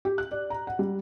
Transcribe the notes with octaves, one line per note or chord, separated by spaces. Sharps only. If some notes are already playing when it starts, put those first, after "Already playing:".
G4
F#6
D5
A#5
F#5
G3